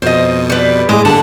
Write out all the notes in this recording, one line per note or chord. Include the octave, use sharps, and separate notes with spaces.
F2 B2 C5 D#5
G3 B4
A2 G#3 E4 G#4 D#5 D6
D3 G3 A#3 D4 F#5 A5